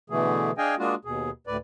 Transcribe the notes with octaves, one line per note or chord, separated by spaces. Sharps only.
B2 D3 E3 A3 G#4
D4 G#4 D#5 F5 G5 G#5
G#3 A#3 D4 F4 F#4
D#2 B2 G#4
D2 A2 B4 D5